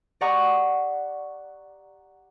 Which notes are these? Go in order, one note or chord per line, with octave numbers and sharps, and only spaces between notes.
G4 D5 F#5 A#5 C#6 D#6